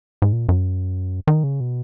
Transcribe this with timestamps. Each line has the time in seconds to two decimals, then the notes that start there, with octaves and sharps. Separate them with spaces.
0.22 G#2
0.33 A#2
0.49 F#2
1.27 D#3
1.44 C#3
1.60 B2